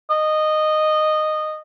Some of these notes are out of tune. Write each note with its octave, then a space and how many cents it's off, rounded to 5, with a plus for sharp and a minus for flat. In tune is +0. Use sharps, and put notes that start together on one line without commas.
D#5 -15